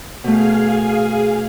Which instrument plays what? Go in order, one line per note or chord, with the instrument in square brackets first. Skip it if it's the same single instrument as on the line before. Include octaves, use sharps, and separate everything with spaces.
[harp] B2 A3 [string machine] G#4 F5 G#5